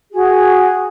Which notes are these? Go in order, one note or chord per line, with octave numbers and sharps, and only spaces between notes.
F#4 G#4